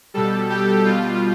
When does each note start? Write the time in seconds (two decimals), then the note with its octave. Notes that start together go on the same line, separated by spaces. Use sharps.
0.14 B2 G3 A4
0.50 G4
0.85 B2 G3 F4